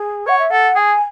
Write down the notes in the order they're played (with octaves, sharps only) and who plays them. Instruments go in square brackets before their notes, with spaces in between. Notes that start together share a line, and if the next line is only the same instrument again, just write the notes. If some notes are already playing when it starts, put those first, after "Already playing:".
Already playing: [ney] G#4
[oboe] C#5 [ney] F#5
[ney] E5
[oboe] A4 [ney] F#5
[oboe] G#4 [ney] G#5